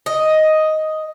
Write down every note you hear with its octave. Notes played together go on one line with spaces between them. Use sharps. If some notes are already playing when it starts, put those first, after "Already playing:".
D#5